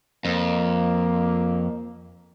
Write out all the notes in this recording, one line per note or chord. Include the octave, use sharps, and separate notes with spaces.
F2 A#3